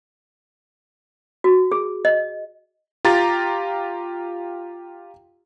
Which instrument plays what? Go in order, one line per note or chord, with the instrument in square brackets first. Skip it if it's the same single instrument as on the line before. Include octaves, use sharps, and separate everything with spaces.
[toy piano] F#4
G#4
D#5
[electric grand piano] F4 G4 A#5 A6